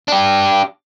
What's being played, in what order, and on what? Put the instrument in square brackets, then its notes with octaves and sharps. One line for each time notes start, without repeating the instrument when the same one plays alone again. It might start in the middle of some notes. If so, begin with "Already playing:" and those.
[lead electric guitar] D4 G4